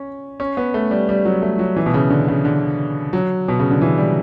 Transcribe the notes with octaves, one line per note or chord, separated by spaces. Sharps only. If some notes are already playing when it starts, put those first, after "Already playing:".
Already playing: C#4
C#4
B3
A3
G3
G3
F#3
A3
F#3
E3
B2
C#3
D3
C#3
D3
F#3
B2
C#3
D3
E3
G3